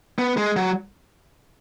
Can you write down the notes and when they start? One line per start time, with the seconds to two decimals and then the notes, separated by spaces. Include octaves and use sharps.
0.19 B3
0.37 G#3
0.56 F#3